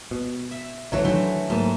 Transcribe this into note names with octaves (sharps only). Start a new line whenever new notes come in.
B2
E5
B1 F#2 E3 F#3 A3 F#4 C#5
D#3 E3 F#3 A3 D4 C5
G#2 F#3 A3 A#3 A5